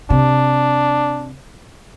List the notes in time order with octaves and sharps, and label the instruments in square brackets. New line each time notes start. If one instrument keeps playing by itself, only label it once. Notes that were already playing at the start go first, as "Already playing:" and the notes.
[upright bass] C3 [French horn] D4